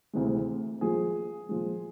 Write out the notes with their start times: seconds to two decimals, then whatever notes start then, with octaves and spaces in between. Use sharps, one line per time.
0.13 D2 C3 E3 G#3
0.81 A#2 F3 G#3 G#4
1.49 A#2 F3 G#3